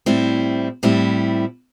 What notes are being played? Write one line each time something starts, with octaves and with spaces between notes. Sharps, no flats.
A2 G3 C4 E4
A2 G3 C4 E4